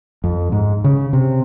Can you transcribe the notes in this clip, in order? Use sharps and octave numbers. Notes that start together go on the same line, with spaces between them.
F2
G#2
C#3
C3